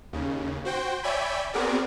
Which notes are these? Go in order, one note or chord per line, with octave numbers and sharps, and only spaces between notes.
D#2 C#3
F#4 C5 G5
C#5 D5 E5 G5 G#5 B5
B3 C4 F#4 G#4 A#4 D5